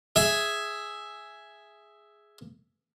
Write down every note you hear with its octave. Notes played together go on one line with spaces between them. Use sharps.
G#4 E5